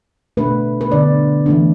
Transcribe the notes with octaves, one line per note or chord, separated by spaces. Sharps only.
B2 A3 D4 B4
B4
D3 B3 D4 D5
E3 A3 D4